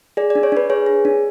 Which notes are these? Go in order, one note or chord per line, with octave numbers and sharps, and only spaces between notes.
G#4 D5
D5
D4
C#5
D4 B4
G#4 C#5
G#4
D4